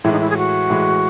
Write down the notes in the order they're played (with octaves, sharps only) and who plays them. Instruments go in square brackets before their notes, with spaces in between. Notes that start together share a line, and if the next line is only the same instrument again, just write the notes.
[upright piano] A2 E3 G#3 [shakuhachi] E4
[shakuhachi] D#4
E4
G#4
F#4
[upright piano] A2 E3 G#3